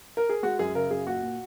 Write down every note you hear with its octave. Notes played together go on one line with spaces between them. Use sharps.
A#4
G#4
G#3 F#4
F#2 G#4
C#3 A#4
F#2 G#4
A#2 F#4
A#2